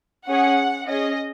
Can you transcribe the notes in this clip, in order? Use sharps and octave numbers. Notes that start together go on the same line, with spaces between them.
C#4 G#4 F#5
C#4 G#4 D#5